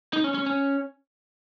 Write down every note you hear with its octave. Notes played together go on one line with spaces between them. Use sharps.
D#4
C#4
C#4
C#4